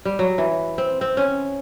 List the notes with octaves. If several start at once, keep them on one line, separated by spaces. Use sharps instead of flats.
G3
F#3
E3
C4
C4
C#4